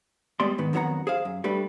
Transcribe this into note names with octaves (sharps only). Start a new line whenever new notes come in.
G3 G#3 B3 D5 C6
G#2 D#3 B3
F2 D#3 F#3 B3 F#5 A#5
G#4 C5 F5
F#2
G3 A3 D4 B4